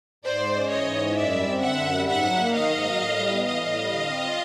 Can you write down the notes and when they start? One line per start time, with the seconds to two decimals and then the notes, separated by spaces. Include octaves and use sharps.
0.25 G#2 C5 D5
0.40 G#3
0.55 C#4
0.71 E3 C#5 D#5
0.86 G#2
1.01 G#3
1.16 F#2 D5 E5
1.32 G3
1.47 C4
1.62 D3 E5 F#5
1.78 F#2
1.93 G3
2.09 G#2 E5 F#5
2.24 F#3
2.39 A#3
2.54 D#3 D#5 F5
2.70 G#2
2.85 F#3
3.01 A2
3.16 G3
3.31 B3
3.46 E3 D#5 F5
3.62 A2
3.77 G3
3.92 D3
4.08 C4
4.23 F4